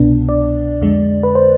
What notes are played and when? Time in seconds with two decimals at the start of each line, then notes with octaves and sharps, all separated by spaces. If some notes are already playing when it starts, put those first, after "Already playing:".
Already playing: C2 B2 B3 D4
0.29 D5
0.82 F2 D3 G#3
1.23 B4
1.35 C5